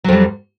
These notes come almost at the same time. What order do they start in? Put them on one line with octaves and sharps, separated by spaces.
F#3 F2 G3